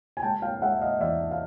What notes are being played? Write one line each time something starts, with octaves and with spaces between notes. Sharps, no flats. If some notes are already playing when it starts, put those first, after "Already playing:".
G#5
G#3 G5 A5
F5 G5
G#3 E5 F#5
D#5 F5
E2 D5 E5
F5